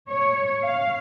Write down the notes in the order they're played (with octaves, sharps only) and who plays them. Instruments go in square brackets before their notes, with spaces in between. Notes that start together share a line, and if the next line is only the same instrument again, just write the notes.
[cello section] C#5
F5